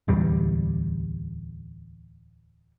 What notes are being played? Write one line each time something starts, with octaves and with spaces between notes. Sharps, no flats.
D1 E2 G3